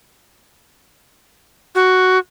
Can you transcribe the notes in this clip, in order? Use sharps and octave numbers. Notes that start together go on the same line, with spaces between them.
F#4